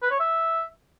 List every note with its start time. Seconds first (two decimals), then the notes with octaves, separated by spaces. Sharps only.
0.02 B4
0.11 C#5
0.20 E5